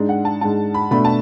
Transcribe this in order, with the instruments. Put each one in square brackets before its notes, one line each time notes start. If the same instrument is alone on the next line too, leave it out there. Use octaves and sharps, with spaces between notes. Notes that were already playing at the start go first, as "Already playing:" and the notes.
Already playing: [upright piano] G#2 G#3 D4
F#5
A5
G#2 G#3 D4 A5
B5
B2 A3 D4 B5
A5